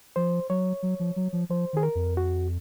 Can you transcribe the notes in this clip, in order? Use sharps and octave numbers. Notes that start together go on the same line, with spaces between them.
F3 C5
F#3 C#5
F#3
F3
F#3
F3
F3 C5
D#3 G#4
A#4
F2
F#4